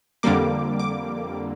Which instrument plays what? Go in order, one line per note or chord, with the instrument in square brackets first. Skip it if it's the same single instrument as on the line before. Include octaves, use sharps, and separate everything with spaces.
[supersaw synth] F2 D3 G3 A#3 D6
D6